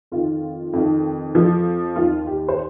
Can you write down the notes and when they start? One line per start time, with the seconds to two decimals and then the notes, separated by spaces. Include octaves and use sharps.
0.12 F2 D#3 F4
0.73 F2 D#3
1.35 F2 F3
1.96 D#2 D#3 F4
2.27 G4
2.48 C5